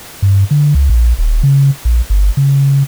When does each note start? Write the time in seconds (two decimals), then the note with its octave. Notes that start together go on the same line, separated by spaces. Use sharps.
0.22 G2
0.51 D3
0.75 C#2
0.89 A#1
1.18 D#1
1.43 C#3
1.85 A#1
2.10 G1
2.37 C#3